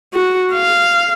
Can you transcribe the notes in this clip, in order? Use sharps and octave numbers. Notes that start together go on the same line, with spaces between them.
F#4
F5